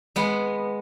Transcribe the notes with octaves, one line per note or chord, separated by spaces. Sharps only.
G#3 B3